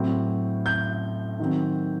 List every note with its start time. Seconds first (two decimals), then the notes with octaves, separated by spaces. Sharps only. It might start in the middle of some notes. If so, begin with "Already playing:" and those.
Already playing: A2 F#3 C4
0.66 G6
1.39 D#3 F#3 C4